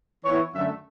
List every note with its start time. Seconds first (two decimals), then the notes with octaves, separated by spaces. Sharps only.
0.23 E3 B3 E4 C#5
0.53 F#2 D3 A3 E5